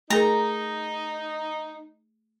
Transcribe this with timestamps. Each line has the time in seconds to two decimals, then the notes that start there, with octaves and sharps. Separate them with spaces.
0.10 A3 D#4 G#4 A#4 A#5